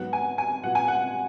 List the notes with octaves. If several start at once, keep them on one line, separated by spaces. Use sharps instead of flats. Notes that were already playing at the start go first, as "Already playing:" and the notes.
Already playing: G#2 F#3 B3 F#5
G#5
G#5
A#2 F#3 B3 F#5
G#5
F#5